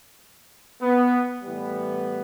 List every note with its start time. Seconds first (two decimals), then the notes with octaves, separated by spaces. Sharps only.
0.81 B3
1.42 A2 E3 G3 B3